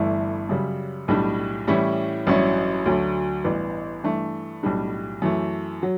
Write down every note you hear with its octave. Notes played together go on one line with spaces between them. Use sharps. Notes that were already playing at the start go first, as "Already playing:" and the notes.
Already playing: G1 G2 E3 A3 E4
F#2 C#3 G3
B1 A2 G3 D4
A2 E3 G3 C#4 E4
A1 G2 F#3 C#4 E4
D2 D3 F#3 A3
A1 G2 E3 B3
G2 E3 A3 D4
B1 A2 G3 D4
F#2 E3 A3
F#3